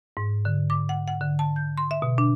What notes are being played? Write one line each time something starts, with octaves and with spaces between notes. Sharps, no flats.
G#2
D3
D6
F#5
F#5
D3
A5
G6
C6
E5
B2
D4